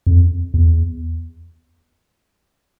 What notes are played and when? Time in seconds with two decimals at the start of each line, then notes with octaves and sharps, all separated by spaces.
0.06 F2
0.54 E2